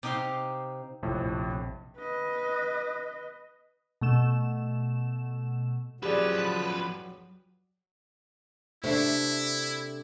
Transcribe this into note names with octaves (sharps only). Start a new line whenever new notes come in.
C3 D#4 G4 D#5 F5 C6
A#1 F2 A2 C3
B4 D#5
B2 A3 E7
F3 F#3 C#4 G4 G#4 B4 D5
C3 A3 D4 E4